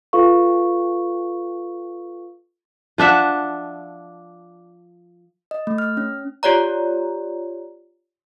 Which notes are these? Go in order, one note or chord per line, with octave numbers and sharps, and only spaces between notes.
F4 A4 B4 F5 C#6
F3 D4 E5 F#5
D#5
A3
F6
C#4
F4 G4 C#5 D5 A#5